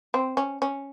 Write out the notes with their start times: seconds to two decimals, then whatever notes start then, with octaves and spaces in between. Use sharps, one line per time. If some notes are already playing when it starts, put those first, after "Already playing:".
0.14 C4
0.37 C#4
0.62 C#4